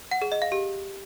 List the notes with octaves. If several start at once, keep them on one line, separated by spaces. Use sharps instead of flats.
F#5
G#4
D#5
F5
G4